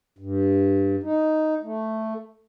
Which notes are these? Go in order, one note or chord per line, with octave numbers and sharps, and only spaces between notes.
G2
D#4
A3